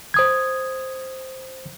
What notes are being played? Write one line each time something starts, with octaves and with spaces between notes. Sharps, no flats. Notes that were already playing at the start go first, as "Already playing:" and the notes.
C5 D#6 G#6